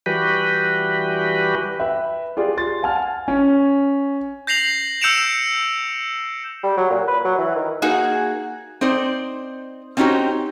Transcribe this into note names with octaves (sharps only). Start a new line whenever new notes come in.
E3 G3 F#4 G4 B4
B4 E5 G5 B5 F#6
F4 G4 G#4 D5 G5 C6
C6 A6
F5 F#5 G#5 A5 F6
C#4
G6 A#6 C7 F7 F#7
E6 G6 C#7 D7 E7 F7
G3
F#3
A#2
B4
F#3
E3
D#3
A#3 D#4 F#4 G#4
C4 D#4 C5 D5
C4 C#4 D#4 F#4 G4 C5